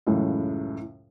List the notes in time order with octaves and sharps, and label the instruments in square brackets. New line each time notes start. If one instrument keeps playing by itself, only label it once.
[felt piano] C#2 F#2 A2 C#3 E3